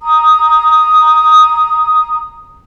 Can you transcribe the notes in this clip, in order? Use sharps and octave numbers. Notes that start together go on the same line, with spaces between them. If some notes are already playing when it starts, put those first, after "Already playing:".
A#5 D#6